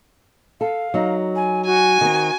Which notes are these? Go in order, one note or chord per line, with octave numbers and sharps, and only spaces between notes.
A4 F5
F#3 D#4
G#5
F#4 G#5
D#3 C4